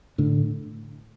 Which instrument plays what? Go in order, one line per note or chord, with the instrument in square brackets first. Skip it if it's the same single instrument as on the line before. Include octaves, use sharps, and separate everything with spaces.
[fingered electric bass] A2 D3